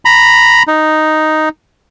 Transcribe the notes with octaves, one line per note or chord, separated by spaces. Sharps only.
A#5 B5
D#4